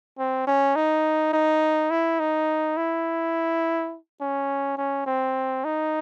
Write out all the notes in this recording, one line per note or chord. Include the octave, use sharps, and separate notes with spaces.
C4
C#4
D#4
D#4
E4
D#4
E4
C#4
C#4
C4
D#4